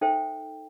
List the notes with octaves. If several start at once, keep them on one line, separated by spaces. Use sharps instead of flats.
D#4 A4 C5 E5 G5